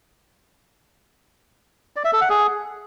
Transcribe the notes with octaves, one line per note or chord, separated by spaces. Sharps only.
D5
E5
A4
F#5
G#4